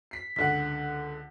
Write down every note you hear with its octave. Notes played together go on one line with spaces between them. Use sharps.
B6 C7
C#2 D3 F#5 B6